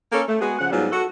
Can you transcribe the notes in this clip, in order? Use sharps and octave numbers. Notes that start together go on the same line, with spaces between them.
A#3 C#4 A4
A3
G#3 B3 F#4 G#4
C#3 F3 F#5
G#2 F#3 G3 B3 F4
F#4 A4